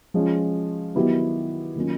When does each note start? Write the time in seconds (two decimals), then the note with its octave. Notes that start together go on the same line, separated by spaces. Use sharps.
0.14 F3 G#3 C#4 F4
0.95 D#3 F#3 B3 E4 G4
1.76 D#3 F#3 A#3 C#4 F4